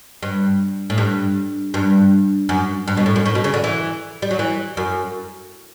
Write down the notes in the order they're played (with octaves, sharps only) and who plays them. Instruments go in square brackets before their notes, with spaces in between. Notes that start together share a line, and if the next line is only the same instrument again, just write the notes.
[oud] G2
A2
G2
G2
F#2
G2
B2
A2
F#2
A2
B2
C#3
D3
E3
G3
F#3
E3
F#2